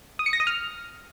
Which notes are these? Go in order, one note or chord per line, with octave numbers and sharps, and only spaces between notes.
D#6
C#7
A#6
D#6
F6